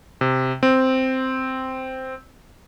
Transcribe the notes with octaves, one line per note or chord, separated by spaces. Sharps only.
C3
C4